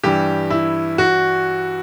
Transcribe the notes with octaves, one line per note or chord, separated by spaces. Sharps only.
G2 E3 G3 G4
E4
F#4